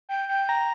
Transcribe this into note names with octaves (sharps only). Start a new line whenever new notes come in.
G5
G5
A#5